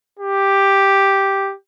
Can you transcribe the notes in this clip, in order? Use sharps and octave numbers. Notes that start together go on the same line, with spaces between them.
G4